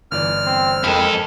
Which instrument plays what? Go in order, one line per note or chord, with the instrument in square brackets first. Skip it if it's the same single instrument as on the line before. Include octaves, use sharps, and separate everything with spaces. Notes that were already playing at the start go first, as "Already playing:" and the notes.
[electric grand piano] G1 E3 D5 [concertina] F6
[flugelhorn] C4
[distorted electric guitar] F2 A4 [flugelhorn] G#3 [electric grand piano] A#4 G5 B5